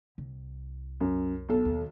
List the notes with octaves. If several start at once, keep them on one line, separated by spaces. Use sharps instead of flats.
C2
F#2
B1 A4
D#2